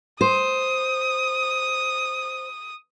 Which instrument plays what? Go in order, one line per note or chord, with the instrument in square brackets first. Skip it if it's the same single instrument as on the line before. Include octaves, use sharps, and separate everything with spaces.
[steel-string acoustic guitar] C5 [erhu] D#6